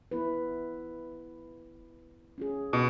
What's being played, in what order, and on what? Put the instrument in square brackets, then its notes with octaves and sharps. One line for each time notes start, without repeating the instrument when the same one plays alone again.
[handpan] B3 E4 B4
C#4 F4 G#4
[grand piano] B2